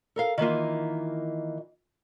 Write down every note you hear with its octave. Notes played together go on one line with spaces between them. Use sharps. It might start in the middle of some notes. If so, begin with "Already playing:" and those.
A4 A#4 F5
D#3 E3 A#3 F4